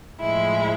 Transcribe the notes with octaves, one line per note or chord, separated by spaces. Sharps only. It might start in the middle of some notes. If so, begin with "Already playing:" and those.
A2 F3 G#3 E4